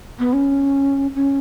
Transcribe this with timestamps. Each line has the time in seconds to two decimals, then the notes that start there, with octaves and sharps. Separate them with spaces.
0.19 B3
0.33 C#4
1.15 C#4